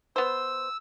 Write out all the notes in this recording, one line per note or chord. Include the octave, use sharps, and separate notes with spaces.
B3 C5 E6